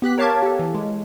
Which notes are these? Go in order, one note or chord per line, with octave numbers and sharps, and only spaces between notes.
B3 G4 F#6 B6
A#4 C#5 F5 A5 D6 G#6
G4 A4
E3
G#3